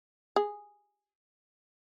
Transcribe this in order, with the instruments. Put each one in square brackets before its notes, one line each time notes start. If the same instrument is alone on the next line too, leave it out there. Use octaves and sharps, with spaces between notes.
[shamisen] G#4